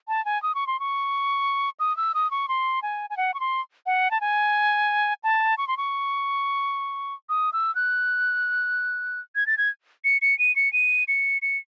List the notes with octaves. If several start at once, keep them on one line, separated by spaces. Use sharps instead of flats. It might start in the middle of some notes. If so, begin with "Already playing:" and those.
A5
G#5
D#6
C#6
C6
C#6
D#6
E6
D#6
C#6
C6
G#5
G#5
F#5
C#6
C6
F#5
A5
G#5
A5
C#6
C6
C#6
D#6
E6
F#6
G#6
A6
G#6
C#7
C#7
D#7
C#7
D#7
C#7
C#7